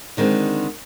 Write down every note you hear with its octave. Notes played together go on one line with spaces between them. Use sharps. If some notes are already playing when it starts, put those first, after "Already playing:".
D3 D#3 G#3 C4